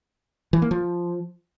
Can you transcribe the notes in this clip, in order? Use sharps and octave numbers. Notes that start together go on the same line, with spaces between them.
E3
A#3
F3